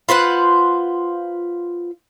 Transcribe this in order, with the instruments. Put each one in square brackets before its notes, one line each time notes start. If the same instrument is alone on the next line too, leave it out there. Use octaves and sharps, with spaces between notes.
[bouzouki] F4 B4 C5 F#5